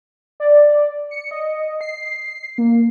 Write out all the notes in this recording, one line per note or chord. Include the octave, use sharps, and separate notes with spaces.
D5
C#7
D#5
C7
A#3